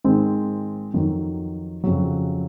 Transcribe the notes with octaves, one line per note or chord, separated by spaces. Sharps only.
G#2 D#3 G#3 C4
F2 D#3 F#3
F2 C#3 F#3